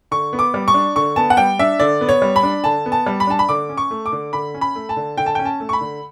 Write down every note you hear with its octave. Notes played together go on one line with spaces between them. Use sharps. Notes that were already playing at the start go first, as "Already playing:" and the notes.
D3 C#6
B3
D6
G3
C#6
D4
D3 C#6
B3 A5
F#5
G3 G5
D4 E5
D3 D5
B3
C#5
G3
B5
D4
D3 A5
B3
A5
G3
B5
D4 A5
B5
D3 D6
C#4
C#6
A3
D6
D3
D3 B5
C#4
B5
A3
A5
D3
D3 G5
A5
C#4 G5
A5
A3
C#6
B5
D3